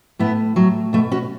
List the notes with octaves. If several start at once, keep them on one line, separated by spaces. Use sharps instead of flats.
A2 B3 E4
A2 F#3
B2 A3
C#4 F#4